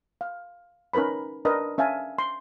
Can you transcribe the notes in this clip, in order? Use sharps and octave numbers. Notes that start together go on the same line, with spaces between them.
F5
C#4 D#4 A#4 B4 B5
D4 A#4 B4 D#5
C#4 E5 F5 G#5 A5
C6